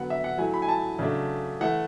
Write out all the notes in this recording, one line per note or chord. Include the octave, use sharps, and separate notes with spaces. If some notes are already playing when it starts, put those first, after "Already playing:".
Already playing: D3 F#3 B3 F#5
E5
F#5
F#3 A3 E4 G#5
B5
G#5
A5
C#3 F#3 A3 D4
E3 A3 E4 F#5